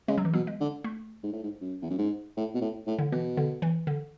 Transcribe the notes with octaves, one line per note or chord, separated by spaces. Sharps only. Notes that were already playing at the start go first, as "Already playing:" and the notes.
C#3 G#3
F#3
E3
B2 F#3
G#3
D3
A3
G#2
A2
G#2
F#2
E2
F#2
G#2
A2
B2
A2
A2
D3
B2 E3
D3
E3
D3